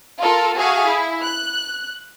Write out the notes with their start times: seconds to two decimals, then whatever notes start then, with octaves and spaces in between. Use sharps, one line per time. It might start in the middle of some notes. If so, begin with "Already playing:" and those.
0.20 F4 A4 A#4
0.57 F#4 G#4 A4 E5 F5 G#5
0.88 E4
1.23 F#6